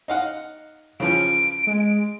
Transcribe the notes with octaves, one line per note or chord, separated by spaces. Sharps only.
D#4 F5 F#5
C#3 E3 F3 D7
G#3